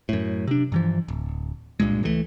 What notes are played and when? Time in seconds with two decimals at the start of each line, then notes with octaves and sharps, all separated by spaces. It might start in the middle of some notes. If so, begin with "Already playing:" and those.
0.09 F#2 A2
0.47 C3 D4
0.72 G2 E3 F3
1.08 D1
1.80 C2 G2 A#2 G#3
2.03 C#2 E3 F#3 A3